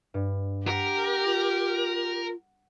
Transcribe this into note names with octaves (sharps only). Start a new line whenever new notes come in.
G2
G4 A#4 F#5 B6
F4